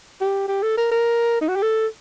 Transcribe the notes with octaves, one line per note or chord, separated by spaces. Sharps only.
G4
G4
A4
A#4
A#4
D#4
F#4
G4
A4